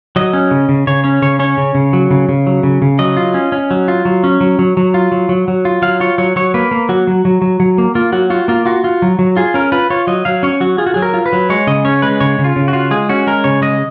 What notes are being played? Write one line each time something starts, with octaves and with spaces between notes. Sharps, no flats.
F#3 D#5
C#4
C#3
C#3
C#3 C#5
C#4 C#5
C#3 C#5
C#4 C#5
C#3
C#3
F#3
C#3
C#3
F#3
C#3
C#3
F#3 D#5
F4
C#4
C#4
F#3
F4
F#3
C#4
F#3
F#3
F#3
F4
F#3
F#3
F#3
F4
F#3 F5
F4 C#5
F#3 C#5
F#3 C#5
A#3 B4
A#3
F#3 F#4
F#3
F#3
F#3
F#3
A#3
A#3 F4
F#3 F#4
F4 F#4
A#3 F4
F4 F#4
F4
F#3
F#3
F4 G#4
C#4 A#4
F4 B4
F4 C#5
F#3 D#5
F#3 F5
C#4 C#5
F#3 F#4
F4 G#4
F#4
F#3 G#4
A#4
F4
B4
F#3
G#3 C#5
C#3 D#5
C#4 C#5
G#3 B4
C#3 C#5
C#3
F4
C#3
F#4
F4
G#3 G#4
C#4 F#4
G#3 A#4
C#3 C#5
G#3 D#5